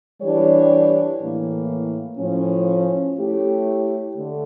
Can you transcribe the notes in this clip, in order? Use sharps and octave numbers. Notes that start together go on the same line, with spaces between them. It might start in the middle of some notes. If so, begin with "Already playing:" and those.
E3 G3 D4 G4 C#5
A2 E3 A#3
A2 F3 C#4
A3 E4 G4 C#5
D3 A3